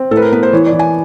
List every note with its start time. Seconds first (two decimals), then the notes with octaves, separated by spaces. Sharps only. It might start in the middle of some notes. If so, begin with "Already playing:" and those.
Already playing: C4
0.11 A2 A4
0.17 B4
0.22 A#4
0.32 B3 B4
0.43 C5
0.53 E3 C#5
0.66 D5
0.73 E3
0.79 G#5